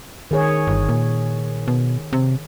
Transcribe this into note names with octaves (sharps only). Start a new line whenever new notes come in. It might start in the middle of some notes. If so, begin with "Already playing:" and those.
D#3 G#4 C#5
G1
A#2
B2
C3